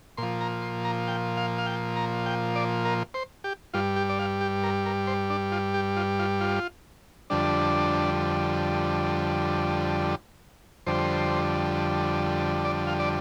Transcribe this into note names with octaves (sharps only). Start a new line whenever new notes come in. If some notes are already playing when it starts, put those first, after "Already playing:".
A#2 F3 C6
A#5
C6
A#5
G5
F5
F5
G5
A#5
G5
D5
A#4
C5
G4
G2 G3 F4
G4
D5
F5
G4
A#4
A#4
C5
D4
F4
G4
F4
F4
F4
F2 D3 G3 D4
F2 D3 G3 C5
D5
F5
D5